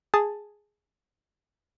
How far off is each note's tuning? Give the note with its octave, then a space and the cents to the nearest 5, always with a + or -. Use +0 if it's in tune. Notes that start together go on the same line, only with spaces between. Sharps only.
G#4 +0 A5 +5